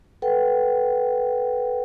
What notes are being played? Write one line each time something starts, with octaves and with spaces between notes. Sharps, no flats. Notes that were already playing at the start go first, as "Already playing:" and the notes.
A4 B4 F#5 G5